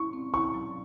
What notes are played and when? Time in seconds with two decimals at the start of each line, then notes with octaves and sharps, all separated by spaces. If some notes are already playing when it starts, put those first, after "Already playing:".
Already playing: E4 C#6
0.13 C4
0.34 E4 C#6
0.54 F#3